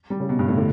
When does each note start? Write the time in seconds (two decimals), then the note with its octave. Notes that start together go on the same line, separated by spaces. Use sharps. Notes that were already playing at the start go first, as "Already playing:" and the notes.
0.10 G3
0.20 C#3
0.29 B2
0.39 G2
0.48 A2
0.57 D3